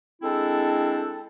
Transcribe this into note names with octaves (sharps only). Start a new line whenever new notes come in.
G#3 C4 D4 E4 A4